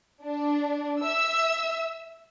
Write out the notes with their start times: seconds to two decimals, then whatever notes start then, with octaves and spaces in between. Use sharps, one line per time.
0.22 D4
1.00 E5 E6